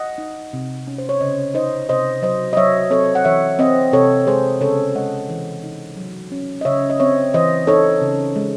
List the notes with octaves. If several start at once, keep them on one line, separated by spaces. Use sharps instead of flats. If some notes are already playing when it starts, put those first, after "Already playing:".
Already playing: D#5 F#5
D#4
C3
C#4
C5
C#5
C#3 C5 D#5
D#4 C5 D#5
C3 C5 D#5
F#3 C5 D#5
D#5
F#3 C#5 E5
C4 A4 C#5
F#5
E3 C#5 E5
C4 C5 D#5
C3 A4 C#5
G#3 G#4 C5
C#3 A4 C#5
G#3 D#5 F#5
E3
D#4
F#3
C#4
D#5
C#3 C#5 E5
D#5
C4 C#5 E5
E3 C5 D#5
D#4 A4 C#5
C#3
G#3